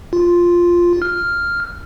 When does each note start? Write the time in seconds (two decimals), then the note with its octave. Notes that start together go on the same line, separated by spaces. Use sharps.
0.13 F4
1.02 F6